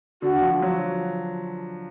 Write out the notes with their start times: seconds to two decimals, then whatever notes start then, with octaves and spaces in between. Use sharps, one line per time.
0.22 D3 F#4
0.42 F3
0.62 F#3